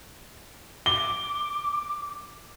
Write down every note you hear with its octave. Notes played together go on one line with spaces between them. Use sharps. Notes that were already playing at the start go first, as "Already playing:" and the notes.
D6 G7